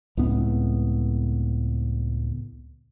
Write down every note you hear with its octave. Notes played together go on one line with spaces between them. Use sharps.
C#2 A2 B3 C4